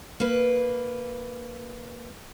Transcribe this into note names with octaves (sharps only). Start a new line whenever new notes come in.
A#3 B4